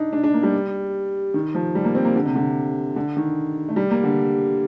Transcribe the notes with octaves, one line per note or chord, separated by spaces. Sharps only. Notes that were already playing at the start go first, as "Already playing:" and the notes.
Already playing: D4 D#4
D4
D4
A#3
G3
D#3
F3
G3
A#3
C4
A#3
D3
C3
D3
D3
D#3
A3
G3
A#3
D3